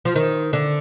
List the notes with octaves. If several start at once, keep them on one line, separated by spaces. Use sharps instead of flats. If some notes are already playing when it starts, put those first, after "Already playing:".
F3
D#3
D3